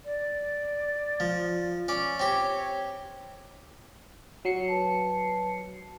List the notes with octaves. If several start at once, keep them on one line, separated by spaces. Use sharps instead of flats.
D5
F3
C#4 D5
C4 G4 C#5
F#3 C7 C#7
B4 A5